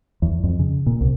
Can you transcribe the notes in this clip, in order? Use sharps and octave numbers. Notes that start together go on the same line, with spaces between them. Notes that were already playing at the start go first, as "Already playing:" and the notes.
E2
F2
C#3
A#2
C2